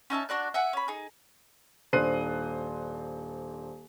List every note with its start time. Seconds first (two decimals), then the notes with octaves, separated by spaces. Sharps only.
0.10 C#4 D#4 E5 A5
0.29 D4 F#4 D5 F#6
0.54 E5 F#5 G#5
0.73 C#4 B5
0.88 D#4 G#4
1.93 D#1 D4 C5 F#6 C7 D#7